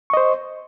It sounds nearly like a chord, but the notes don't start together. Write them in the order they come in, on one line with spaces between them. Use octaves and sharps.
C#6 D#5 C5